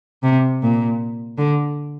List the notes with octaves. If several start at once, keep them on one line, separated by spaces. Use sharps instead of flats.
C3
A#2
D3